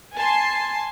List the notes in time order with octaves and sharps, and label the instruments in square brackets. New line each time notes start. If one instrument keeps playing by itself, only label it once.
[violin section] G#5 A5 C6